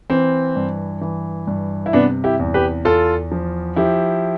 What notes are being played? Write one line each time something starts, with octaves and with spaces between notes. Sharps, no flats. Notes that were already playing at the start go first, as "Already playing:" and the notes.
E3 C4
G2
E3
G2
E4
C3 B3 D4
E4 G4
E2
G4 B4
E2 F4 A4
F3
F3 E4 G4